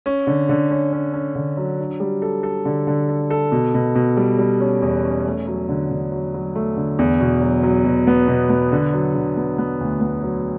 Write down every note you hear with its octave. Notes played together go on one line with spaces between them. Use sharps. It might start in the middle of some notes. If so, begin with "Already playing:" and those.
C#4
D3
D3
C#4
C#4
C#4
D3
F#3
D4
G3
A4
A4
D3
D3
A4
A4
B2
B2
B2
G3
G3
C#4
E2
C#4
A3
F#3
D3
D3
F#3
F#3
A3
D3
E2
B2
F#3
F#3
B2
B3
B2
B3
D3
F#3
D3
B3
B3
D2
B3
F#3